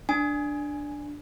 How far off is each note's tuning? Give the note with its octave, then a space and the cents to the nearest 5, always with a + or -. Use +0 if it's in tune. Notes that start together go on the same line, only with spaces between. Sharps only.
D4 +0 G#5 +0